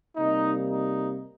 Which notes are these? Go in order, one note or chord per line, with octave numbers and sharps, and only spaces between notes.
C3 G3 A#3 D#4
D#4